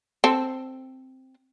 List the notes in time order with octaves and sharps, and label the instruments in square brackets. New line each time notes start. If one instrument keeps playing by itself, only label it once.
[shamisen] C4 A4